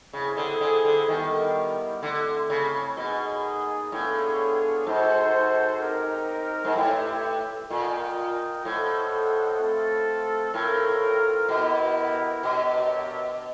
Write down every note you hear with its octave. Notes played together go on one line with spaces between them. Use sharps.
C#3 C4 E4 G#4
D3
D3
D3
D#3 G3 B3 E4 G4 A#4
D3 A3 C4 E4
C#3
B2 A#3 D#4 G#4
A2 B3 D4 F4 G#4 C#5
G#2 F#4 A4 C5
C4 D#4 G4 A#4
G#2
A2 D#4 G4 B4 E5 G5
A#2 F4 A#4 D#5 G5
A2 F4 A4 C5 D#5 F#5
A3 C4 F4 A4
A2 C4 F4 A#4
B2 B3 E4 G4 A#4
B2 D4 G4 A#4 C#5 E5